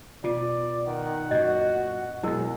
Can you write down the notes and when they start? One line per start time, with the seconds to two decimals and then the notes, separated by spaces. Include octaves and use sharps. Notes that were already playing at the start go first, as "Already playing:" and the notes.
0.24 B2 F4 D5
0.86 D#3 F#5
1.31 F#2 A#2 F#4 D#5
2.23 B2 F#3 G#3 E4 A#4